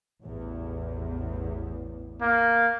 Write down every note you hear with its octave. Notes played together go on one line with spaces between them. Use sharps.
A1 E2
A#3